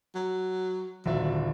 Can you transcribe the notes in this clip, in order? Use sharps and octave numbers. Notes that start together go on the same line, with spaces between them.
F#3
D#1 G#1 D3 F#3 D5 E5